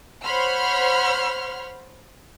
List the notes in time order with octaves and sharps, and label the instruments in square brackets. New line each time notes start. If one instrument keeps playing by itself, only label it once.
[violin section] C5 C#5 F#5 B5 C6 F6